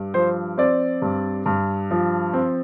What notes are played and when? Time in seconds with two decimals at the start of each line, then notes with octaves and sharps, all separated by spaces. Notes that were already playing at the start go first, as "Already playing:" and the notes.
Already playing: G2
0.14 F3 C5
0.58 C4 D5
1.02 G2
1.46 G2
1.91 F3
2.34 C4